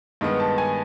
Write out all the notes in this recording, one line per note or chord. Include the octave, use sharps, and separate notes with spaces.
G2 D#3 G#3 B3
A5
G#5